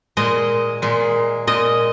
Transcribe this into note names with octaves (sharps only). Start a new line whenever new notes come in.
A#2 G#3 D#5
A#2 G#3
A#2 G#3 D#5